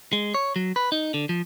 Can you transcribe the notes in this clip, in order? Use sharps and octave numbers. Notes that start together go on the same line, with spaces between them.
G#3
C#5
F#3
B4
D#4
D3
F3